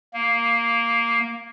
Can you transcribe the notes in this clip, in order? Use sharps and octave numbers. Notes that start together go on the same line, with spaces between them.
A#3